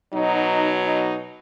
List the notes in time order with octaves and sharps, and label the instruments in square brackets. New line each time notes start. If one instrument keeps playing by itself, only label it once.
[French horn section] B2 F#3 D#4
D#4